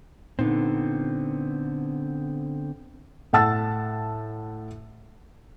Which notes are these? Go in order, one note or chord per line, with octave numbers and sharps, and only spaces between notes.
A#2 D3 B3 C4 D#4
A2 F#5 A5 E6 A6